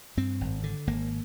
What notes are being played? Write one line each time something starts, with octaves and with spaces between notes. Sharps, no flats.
G2 C4
G#1
D3
G#1 A#3